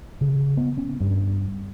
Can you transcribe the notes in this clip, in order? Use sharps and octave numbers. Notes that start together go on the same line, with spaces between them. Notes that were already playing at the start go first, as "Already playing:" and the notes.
C#3
B3
C#4
G2